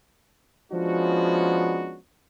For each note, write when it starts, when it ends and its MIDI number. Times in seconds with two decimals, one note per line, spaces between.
0.73 1.97 53
0.73 1.97 56
0.73 1.97 59
0.73 1.97 61
0.73 1.97 62
0.73 1.97 66